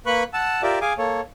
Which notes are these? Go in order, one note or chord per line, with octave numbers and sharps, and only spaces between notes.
A#3 B4 B5 C#6 F#6
F#5 A5 E6
F4 G4 A#4 D5 E5
G#4 F5 G#5 D6
A#3 A4 C#5